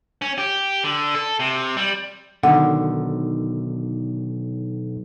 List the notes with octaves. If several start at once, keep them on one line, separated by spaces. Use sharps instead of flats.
C#4
G4
D3
A4
C3
G3
B1 D3 D#3 F#5